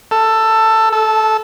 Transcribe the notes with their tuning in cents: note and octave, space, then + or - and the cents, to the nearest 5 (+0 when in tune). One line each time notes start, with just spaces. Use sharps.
A4 +10
A4 -15